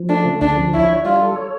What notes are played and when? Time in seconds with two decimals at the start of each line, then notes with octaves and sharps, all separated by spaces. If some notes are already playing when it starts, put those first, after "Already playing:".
Already playing: F3
0.09 A3 D4
0.25 C#3
0.41 D2 D4
0.57 F3
0.73 E4 C#5
0.89 D4
1.04 G3 F4
1.21 A4
1.36 C#5